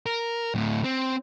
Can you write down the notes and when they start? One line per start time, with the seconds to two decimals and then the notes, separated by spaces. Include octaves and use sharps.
0.06 A#4
0.55 D2 A2
0.84 C4